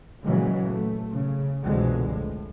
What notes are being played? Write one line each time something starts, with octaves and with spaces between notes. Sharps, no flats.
A#2 C#3 E3 F#3 G#3
A3
C#3
C2 F2 B2 D3 E3 G#3
A2